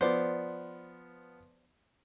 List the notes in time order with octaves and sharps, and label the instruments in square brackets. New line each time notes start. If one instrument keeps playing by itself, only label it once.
[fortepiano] F3 B3 [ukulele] C5 D5